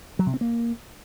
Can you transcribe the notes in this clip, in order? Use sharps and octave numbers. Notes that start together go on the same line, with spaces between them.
F#3
C3
C4
A#3